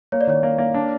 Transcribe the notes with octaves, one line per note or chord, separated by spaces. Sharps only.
A#3 C#5
D5
D#3 C#5
A#3
A#3
D4